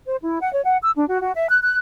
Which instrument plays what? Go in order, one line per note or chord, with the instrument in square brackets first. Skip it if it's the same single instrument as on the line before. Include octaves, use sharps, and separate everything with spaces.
[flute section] C5
E4
F#5
C#5
F#5
E6
D4
F#4
F#4
E5
F#6
F#6